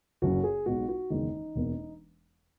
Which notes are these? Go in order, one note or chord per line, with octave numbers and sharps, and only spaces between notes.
F#1 F#2 C#3 F#4
G#4
B1 B2 G#3 F#4
F#4
F#1 E2 D#3 G#3 D#4
E1 E2 B2 A#3